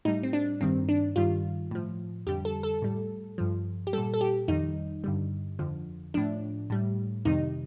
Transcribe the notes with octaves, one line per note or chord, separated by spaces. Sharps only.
A2 G3 D#4
C4
D4
G2 D#3 G3 C4
D4
G2 D#3 G3 F4
A2 F3
F2 D3 G3 G4
A4
A4
A2 G3
G2 F3
G4
A#2 G3 A4
A4
G4
F2 D#3 G3 D#4
G2 D3 G3
F2 D3 F3
A2 F3 D4
A2 G3
F2 C3 D#3 G3 D#4